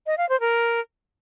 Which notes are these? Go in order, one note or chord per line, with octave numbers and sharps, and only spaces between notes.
D#5
F5
C5
A#4